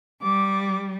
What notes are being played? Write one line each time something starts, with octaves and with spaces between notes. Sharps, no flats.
G3 D6